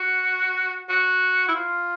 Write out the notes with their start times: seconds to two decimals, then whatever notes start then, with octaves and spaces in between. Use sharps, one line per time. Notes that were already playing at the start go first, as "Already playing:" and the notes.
Already playing: F#4
0.89 F#4
1.48 E4
1.55 F4